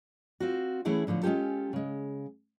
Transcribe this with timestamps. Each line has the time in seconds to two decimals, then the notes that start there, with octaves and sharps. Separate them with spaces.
0.40 C4 F4 F#4
0.85 E3 A3 C#4 E4 G#4 F#5
1.07 A2 D3 F3 B3
1.22 G#3 C#4 F4 G4 A4
1.73 C#3 G#3